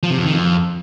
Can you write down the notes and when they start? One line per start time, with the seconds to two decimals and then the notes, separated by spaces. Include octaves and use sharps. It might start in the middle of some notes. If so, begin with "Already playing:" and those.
0.03 F3
0.11 C3
0.18 F2
0.26 D#3
0.33 F2